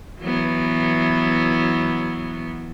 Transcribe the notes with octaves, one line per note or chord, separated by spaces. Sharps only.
E3 F#3 B3